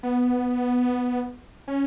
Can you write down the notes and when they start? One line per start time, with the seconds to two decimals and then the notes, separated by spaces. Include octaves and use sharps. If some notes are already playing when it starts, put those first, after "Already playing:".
0.03 B3
1.68 C#4